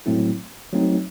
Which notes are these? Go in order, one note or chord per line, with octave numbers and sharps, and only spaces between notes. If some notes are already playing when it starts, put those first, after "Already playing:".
A2 F#3 A3 C4 E4
F#3 A3 C4 D#4